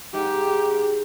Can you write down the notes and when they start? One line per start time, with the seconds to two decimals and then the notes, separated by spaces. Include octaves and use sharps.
0.14 G#2 G4